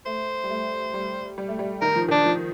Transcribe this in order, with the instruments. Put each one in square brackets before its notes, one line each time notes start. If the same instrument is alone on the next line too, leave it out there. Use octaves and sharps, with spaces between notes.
[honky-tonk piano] A3 [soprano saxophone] C5
[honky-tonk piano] G3
A3
G3
G3
A3
G3
[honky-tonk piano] D#3 [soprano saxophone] A#4
[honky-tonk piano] F3
[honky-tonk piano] D#3 [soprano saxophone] D4
[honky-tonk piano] F3